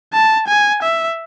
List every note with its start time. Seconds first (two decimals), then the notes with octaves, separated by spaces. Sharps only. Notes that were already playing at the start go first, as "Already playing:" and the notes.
0.13 A5
0.48 G#5
0.83 E5